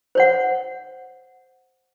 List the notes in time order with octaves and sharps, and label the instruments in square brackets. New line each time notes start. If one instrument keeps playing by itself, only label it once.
[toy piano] C5 C#5 F#5